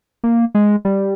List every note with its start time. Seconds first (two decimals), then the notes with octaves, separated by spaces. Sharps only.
0.24 A#3
0.55 G#3
0.85 G3